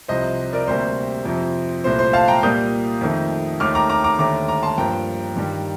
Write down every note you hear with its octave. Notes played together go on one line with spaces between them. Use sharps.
C2 C3 F3 C5 D#5
A#4 D5
D2 C3 G3 A#3 C5
F2 C3 F3
C2 A#2 A3 C5
C5
F5 A5
G5 A#5
A#2 G3 A#3 D#6 G6
F2 D#3 A3
D#2 D#3 A3 D6 F6
A#5 D6
A#5 D6
A#5 D6
D#2 D3 A3 A#5 D6
A#5 D6
A5 C6
G2 F3 A#3 G5 A#5
G2 D#3 G3